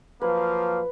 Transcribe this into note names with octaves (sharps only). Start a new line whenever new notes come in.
F3 F#3 A#3 B4